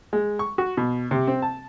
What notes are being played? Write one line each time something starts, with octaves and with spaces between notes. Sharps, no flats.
G#3
C#6
F#4
B2
C3
C4
A5